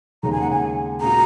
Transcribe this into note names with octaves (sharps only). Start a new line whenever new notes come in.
D#2 C#3 G#3 A#5
G#5
F#5
G#5
A#2 G#3 F#4 A#5